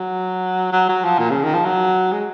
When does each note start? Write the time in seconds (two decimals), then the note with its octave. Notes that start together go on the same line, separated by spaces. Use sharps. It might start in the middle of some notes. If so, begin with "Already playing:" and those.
Already playing: F#3
0.72 F#3
0.89 F#3
1.04 F3
1.19 A#2
1.30 C#3
1.43 D#3
1.54 F3
1.65 F#3
2.12 G#3